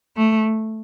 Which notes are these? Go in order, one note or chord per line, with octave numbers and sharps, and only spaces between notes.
A3